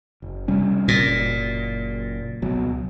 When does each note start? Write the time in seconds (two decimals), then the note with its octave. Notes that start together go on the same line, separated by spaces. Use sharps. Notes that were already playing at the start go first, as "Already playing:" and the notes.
0.22 F#1
0.48 C3 G3 C#4
0.88 A#2
1.04 F#1
2.42 C#2 B2 F#3